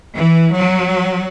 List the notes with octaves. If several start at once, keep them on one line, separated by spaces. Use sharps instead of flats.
E3
F#3